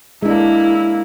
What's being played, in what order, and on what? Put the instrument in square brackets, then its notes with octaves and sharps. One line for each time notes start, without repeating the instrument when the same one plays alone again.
[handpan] G#3 D4 [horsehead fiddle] A#3 E4